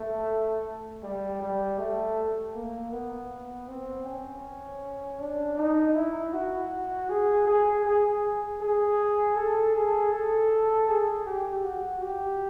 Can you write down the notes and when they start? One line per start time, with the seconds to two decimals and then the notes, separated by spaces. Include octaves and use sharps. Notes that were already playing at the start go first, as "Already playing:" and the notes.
Already playing: A3
1.03 G3
1.40 G3
1.78 A3
2.54 A#3
2.92 B3
3.68 C4
4.06 C#4
5.20 D4
5.57 D#4
5.95 E4
6.33 F#4
7.09 G#4
7.47 G#4
7.84 G#4
8.61 G#4
9.36 A4
9.74 G#4
10.12 A4
10.88 G#4
11.26 G4
11.64 F#4
12.02 G4